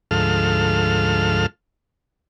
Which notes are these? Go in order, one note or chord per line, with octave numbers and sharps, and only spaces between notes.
D2 G#2 F3 A4 F6